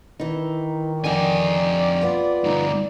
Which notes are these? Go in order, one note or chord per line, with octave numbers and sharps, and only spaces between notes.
D#3 E3 D#4
F2 D3 D#4 G4 D5 G#5
B3 F4
D2 G2 D#4